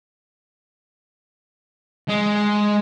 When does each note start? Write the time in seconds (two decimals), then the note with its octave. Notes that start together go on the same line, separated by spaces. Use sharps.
2.09 G#3